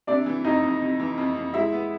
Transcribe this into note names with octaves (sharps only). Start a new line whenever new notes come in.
C3 D4 D5
E3
F2 D#4 D#5
F2
C3
E3
F2
F2
G#3 E4 E5
B3